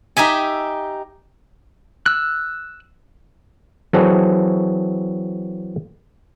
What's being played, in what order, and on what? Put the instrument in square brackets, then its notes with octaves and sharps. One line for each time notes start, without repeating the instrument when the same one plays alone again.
[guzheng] D#4 G4 E5 G#5
[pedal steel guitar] E6 F#6
[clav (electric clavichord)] E3 F#3 C4 G#4 A4